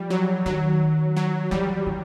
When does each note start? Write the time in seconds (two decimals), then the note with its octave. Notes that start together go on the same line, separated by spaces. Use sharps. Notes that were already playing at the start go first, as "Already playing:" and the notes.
Already playing: F3 G3
0.10 F#3
0.46 D#3 F#3
1.17 F#3
1.51 E3 G3
1.87 E3